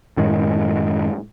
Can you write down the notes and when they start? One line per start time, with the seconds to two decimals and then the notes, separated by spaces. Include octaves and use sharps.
0.17 F#2 A2 D#3 G#3